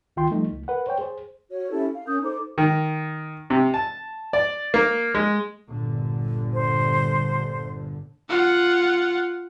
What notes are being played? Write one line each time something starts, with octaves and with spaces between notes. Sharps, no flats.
C#2 D#3 F4 G5 C6
F3 G3 A3 D#4
C#2
A#4 B4 F#5
C5 C#5 G5
G#4 C5
F#4 C#5
C#4 E4 G4 A4
F5
C#4 A#4 D#6 G6
D#4 A4 C5 D6
D#3
C3
A5
D5
A#3
G#3
G1 A#2 D3
C5
F4 F#5